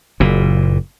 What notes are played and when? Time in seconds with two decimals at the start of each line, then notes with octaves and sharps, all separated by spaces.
0.20 F#1 A#2